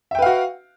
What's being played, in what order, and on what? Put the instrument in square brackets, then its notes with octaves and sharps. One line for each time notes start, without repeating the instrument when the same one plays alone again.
[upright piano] E5
G5
B4
F5
F#4